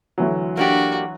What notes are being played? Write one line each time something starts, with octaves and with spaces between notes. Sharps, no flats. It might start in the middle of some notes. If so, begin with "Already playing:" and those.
D2 E3 F#3
A#3 D4 F#4 G4